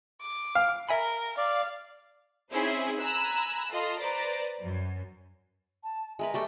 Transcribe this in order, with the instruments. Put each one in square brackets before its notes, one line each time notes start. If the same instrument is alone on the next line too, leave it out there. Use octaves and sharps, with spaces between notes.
[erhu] D6
[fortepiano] F5
[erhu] A#4 [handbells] E5 G#5 B5
[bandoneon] D5 [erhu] F5
[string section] C4 C#4 D#4 E4 G#4 C5
G#5 A#5 B5 E6 F#6
F4 A4 D#5 C6
B4 C5 D5 A#5
F#2
[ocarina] A5
[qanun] G#3 A#4 B4 [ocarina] E5
[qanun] G3 A3 G5 [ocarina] C#6